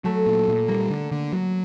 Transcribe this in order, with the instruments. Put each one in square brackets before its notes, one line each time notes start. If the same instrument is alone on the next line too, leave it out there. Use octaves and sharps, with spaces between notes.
[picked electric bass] F#3 [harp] A3
[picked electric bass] A#2
A#2
[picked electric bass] G3 [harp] A#3
[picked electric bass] D3
D3
F#3